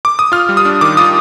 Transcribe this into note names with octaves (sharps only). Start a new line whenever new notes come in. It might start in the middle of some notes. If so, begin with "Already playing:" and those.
D6
D#6
F4 F6
G3
D#6
D4
D#3 D6
F4 D#6